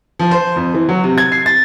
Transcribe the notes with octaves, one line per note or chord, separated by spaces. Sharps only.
F3
C5
F2
E3
F#3
C3
G#6
C7
A6